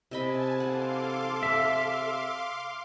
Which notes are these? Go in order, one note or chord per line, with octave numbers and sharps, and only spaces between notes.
C3 D#5 G#5 A5 B5
A4 F5 F#5 C6 D6
E5